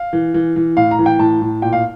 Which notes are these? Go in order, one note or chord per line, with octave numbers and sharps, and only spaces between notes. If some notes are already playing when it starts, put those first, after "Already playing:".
Already playing: F5
E3
E3
E3
A2 F5
A#5
E3
G5
A2 A5
A2
A#2 G5
F5